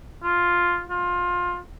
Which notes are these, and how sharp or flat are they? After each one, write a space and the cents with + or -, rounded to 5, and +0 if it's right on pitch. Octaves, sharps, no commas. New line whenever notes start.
F4 +5
F4 +20